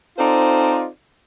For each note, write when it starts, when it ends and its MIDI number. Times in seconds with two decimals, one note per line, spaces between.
0.18 0.87 60
0.18 0.87 63
0.18 0.87 65
0.18 0.87 69
0.18 0.87 72
0.18 0.87 74